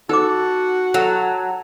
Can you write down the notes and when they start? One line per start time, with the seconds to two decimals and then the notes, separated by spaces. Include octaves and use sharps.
0.09 D#4 F#4 A4 C5 D6
0.94 F#3 A4